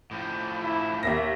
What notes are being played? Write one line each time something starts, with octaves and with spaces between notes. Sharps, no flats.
A2 F3
E4
D#2 A#3 E5 A#6